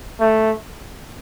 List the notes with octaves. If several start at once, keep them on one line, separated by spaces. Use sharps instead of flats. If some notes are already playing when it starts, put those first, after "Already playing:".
A3